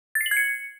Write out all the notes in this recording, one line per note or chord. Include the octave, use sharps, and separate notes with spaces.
A6
C7
F#7
G#6
C#7